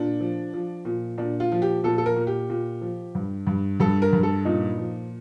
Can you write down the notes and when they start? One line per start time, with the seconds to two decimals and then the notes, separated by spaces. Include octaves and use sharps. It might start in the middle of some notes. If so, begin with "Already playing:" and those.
Already playing: A#2 D4
0.20 F3
0.54 F3
0.85 A#2
1.18 A#2 D4
1.40 F4
1.52 F3
1.62 G4
1.84 A#2 A4
1.98 A4
2.06 A#4
2.17 A#2
2.27 G4
2.50 A#2
2.81 F3
3.15 G2
3.47 G2
3.80 G2 A4
4.02 A#4
4.13 G2
4.23 A4
4.45 A#2 D#4
4.78 F3